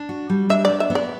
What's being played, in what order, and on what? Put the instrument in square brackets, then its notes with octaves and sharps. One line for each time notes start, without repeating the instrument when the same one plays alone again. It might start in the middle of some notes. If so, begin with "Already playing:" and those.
Already playing: [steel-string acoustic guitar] D4
F#4
G3
[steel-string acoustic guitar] D4 [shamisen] E5
[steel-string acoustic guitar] B3 [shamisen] D5
[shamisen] E5
[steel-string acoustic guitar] B3
[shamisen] D5